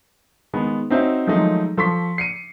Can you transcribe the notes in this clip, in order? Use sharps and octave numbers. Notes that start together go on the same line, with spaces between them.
D#3 G#3 B3
C4 C#4 D#4 F#4 C5 E5
D#3 F3 F#3 G#3 A3 D#4
F3 A4 C6 C#6 B6
C7 C#7 D#7